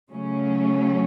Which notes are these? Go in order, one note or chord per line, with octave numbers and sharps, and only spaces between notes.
C#3 F#3 A3 C#4